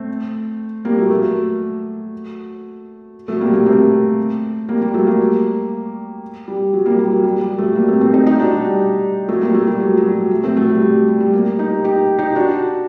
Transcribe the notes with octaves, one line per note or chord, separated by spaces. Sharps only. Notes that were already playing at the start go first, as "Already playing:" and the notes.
Already playing: A3 C4
G3 A#3
F#3 A3
F#3 A3
F#3 A3
G3 A#3
G3 A#3
A3 C4
G3 A#3
G3
F#3 A3
G3 A#3
G3
F#3
G3 A#3
G3
F#3
G3
G3
F#3 A3
G3 A#3
A3 C4
A3 C4
C4 D#4
D#4 G4
D4 F#4
G3
G3
F#3 A3
G3 A#3
F#3 A3
G3
F#3
F#3
G3
F#3 A3
A3 C4
F#3 A3
G3
G3
G3
G3
G3 A#3
D#4 G4
D#4 G4
D#4 G4
D4 F#4